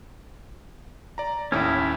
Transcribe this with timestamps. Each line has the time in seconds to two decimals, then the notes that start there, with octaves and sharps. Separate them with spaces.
1.18 D5 A#5
1.52 D#2 A2 C#4 E4